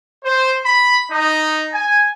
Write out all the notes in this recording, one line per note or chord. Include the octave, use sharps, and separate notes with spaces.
C5
B5
D#4
G#5